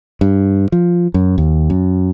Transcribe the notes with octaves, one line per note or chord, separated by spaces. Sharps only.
G2
F3
F#2
D#2
F#2